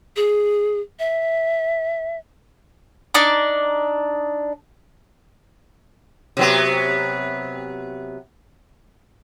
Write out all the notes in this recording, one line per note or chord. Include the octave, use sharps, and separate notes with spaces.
G#4
E5
D4 D#4 D6
C3 F#3 B3